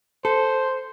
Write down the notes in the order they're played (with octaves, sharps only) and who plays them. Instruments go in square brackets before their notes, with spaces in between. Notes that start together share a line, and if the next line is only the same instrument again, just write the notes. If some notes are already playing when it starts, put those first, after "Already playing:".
[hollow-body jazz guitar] A4 [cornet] C5